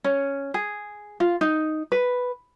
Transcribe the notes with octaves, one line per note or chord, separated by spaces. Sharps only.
C#4
G#4
F4
D#4
B4